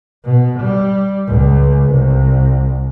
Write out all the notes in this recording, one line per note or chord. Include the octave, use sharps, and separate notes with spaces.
B2
G3
C#2
C2